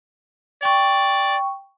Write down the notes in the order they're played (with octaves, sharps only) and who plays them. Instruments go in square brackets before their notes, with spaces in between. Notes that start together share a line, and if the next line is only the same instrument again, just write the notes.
[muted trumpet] D5 [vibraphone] G5 C#6